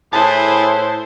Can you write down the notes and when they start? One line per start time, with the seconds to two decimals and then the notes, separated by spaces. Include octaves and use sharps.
0.13 A2 E4 G#4 B4 C5 A5